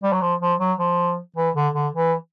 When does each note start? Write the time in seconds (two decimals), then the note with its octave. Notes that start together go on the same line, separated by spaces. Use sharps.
0.03 G3
0.12 F#3
0.21 F3
0.41 F3
0.60 F#3
0.79 F3
1.36 E3
1.55 D3
1.75 D3
1.93 E3